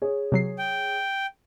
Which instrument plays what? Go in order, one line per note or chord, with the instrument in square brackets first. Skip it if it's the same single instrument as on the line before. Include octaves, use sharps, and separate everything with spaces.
[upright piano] G#4 C#5
[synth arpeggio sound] C3 F#3 C7
[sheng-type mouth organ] G5